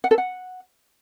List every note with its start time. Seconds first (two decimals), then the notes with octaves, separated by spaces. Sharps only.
0.04 F#5
0.11 A4
0.18 F#5